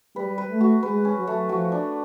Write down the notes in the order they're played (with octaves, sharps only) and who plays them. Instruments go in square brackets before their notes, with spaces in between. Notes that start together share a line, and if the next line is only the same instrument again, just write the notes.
[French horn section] G3 [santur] B4
[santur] B4
[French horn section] A3
[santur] F#4
[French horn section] G#3 [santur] B4
[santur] C#4
[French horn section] F#3
[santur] A3
[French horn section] F3 [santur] F#4
[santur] D4